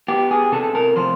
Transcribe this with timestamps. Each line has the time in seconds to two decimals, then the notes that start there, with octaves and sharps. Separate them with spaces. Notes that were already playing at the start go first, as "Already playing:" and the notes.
0.08 B3 G4
0.31 G#4
0.52 C3 A4
0.75 A#4
0.96 F3 C5